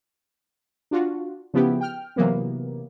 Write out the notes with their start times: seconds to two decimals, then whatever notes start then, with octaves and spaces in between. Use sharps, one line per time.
0.91 D4 F4 F#4
1.54 C#3 F3 B3 E4 G4
1.81 G5 F6
2.16 C3 E3 F#3 A#3 B3